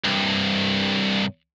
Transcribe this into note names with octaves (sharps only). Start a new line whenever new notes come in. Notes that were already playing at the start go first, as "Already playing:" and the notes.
C2 G2